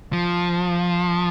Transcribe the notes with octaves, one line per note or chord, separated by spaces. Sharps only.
F3